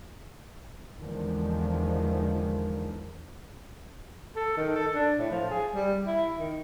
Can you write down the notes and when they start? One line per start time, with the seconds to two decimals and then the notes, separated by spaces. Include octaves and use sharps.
0.97 E2 D3 D#3 F3 G#3
4.36 A4
4.57 D#3
4.76 A4
4.95 D4
5.18 A2
5.31 F3
5.50 G#4
5.75 G3
6.07 E4
6.38 D#3